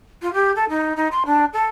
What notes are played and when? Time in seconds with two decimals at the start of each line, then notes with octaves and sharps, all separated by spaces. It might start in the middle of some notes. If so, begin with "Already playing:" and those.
0.22 F4
0.34 G4
0.55 A4
0.69 D#4
0.96 D#4
1.11 C6
1.26 D4
1.53 A4